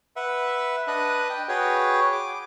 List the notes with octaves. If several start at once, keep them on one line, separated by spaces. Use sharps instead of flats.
B4 E5 F#5
D4 B4 D#5 F#6
G5
F#4 G#4 B4 C#5 G5
D6